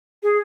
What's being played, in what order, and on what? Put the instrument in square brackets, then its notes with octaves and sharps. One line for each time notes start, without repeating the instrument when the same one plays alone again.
[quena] G#4